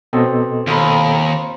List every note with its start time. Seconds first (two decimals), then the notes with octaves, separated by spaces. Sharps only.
0.13 B2 C4 A4 D#5
0.67 D#2 F4 A#5 B5